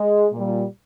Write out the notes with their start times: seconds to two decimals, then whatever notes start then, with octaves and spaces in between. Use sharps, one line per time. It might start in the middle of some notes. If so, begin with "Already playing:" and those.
Already playing: G#3
0.32 A#2 G3